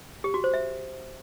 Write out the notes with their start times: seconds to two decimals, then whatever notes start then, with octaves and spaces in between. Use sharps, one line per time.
0.24 G4
0.34 F#4
0.44 C5
0.54 E5